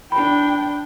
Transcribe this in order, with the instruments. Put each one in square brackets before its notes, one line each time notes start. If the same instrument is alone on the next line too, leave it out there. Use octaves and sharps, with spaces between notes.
[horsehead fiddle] D4 G5 [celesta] B5